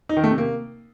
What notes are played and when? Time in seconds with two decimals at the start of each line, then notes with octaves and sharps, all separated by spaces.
0.09 D#4
0.17 D#3
0.24 A3
0.31 C3
0.38 A#3